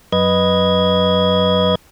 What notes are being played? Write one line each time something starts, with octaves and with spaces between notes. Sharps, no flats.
F#2 B4 D#5 G#6